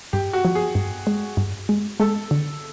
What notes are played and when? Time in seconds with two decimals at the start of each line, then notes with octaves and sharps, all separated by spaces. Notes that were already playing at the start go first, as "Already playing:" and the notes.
0.13 G2 G4
0.33 F#4
0.45 F3
0.55 G#4
0.75 G2
1.07 G#3
1.37 G2
1.69 G#3
2.00 G#3 A4
2.31 D3